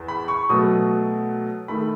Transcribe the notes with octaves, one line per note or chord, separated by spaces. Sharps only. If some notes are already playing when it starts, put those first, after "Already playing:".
Already playing: E2
B5
C#6
B2 F#3 A3 D#6
D#3 A3 B5